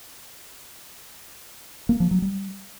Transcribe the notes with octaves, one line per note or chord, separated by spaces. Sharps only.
A#3
F3
F#3
G3